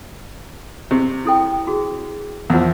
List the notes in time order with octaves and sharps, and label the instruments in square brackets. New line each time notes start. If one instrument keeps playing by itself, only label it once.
[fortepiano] C3 [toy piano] G4
[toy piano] E4 A4 G5
F#4 G#4
[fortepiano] E2 F3 [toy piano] A#4 F#5